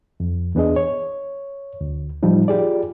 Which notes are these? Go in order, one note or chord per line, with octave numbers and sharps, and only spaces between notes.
F2
E2 B3 D4 G#4 D#5
C#5
D2
A2 F3 G3 D#4
F4 G4 G#4 D5